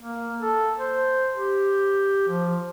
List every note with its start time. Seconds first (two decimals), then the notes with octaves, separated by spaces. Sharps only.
0.01 A#3
0.41 A4
0.79 C5
1.35 G4
2.28 F3